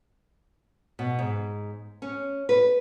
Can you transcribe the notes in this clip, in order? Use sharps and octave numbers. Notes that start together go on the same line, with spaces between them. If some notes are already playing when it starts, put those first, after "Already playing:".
B2
G#2
C#4
B4